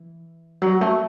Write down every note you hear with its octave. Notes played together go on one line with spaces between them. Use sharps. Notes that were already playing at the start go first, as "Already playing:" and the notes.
Already playing: E3
F#3
A3